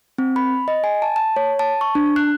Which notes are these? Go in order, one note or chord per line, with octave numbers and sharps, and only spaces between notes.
C4
B5
D#5
G#5
A5
A5
C#5
A5
C#6
D4
F#6